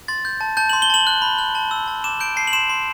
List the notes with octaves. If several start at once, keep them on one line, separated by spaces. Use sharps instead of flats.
C6 A6
G6
A5
A5 G6
C6 F#7
G7
A5 F#7
F#6
B5
F#6
A5
E6
A5
D6 E7
G6 D7
A5 C7
F#7
C6 E7
C6